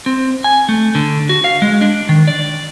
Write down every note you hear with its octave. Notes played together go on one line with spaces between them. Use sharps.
C4
G#5
A3
D3
F#4
F5
G#3
D4
D#3
D5